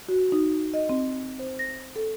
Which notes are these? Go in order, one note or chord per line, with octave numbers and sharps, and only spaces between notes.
F#4
D#4
D#5
C4
C5
A#6
A4